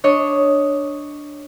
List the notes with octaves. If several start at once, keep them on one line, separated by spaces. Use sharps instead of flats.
D4 C#5 D#5